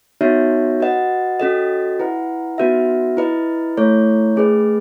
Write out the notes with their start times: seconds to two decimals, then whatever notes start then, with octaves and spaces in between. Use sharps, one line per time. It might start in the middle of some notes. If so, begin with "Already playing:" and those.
0.21 B3 D#4 F#4 C#5 E5
0.80 F#4 B4 D#5 F#5
1.40 C#4 F#4 A4 D#5
1.99 E4 B4 F#5
2.58 B3 D#4 F#4 B4 E5
3.17 E4 B4 D#5
3.77 A3 E4 A4 C#5
4.36 A3 C#4 G#4 B4 D#5